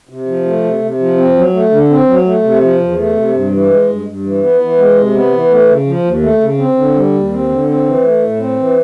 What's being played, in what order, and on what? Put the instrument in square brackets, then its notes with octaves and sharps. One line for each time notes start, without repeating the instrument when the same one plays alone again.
[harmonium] C3
F3
A3
C3
C3
F3
C4
F#3
A3
D3
C4
F#3
A3
C3
F3
E2
A3
C3
G2
E3
G#3
G2
G2
E3
B3
E3
G#3
C3
B3
E3
A3
C#3
F3
D#2
A3
C#3
C4
D3
G3
D#2
C4
D3
C4
E3
A3
A2
C4
E3